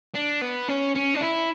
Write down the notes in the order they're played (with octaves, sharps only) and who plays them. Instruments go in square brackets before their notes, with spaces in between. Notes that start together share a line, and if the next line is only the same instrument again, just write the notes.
[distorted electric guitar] D4
B3
C#4
C#4
D4
E4